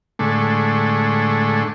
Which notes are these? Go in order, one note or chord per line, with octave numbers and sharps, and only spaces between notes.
A2 D3 G#3 A3